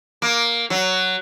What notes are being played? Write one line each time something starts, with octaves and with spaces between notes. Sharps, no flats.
A#3
F#3